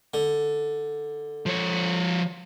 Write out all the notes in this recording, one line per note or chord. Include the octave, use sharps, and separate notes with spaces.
D3
F3 C#5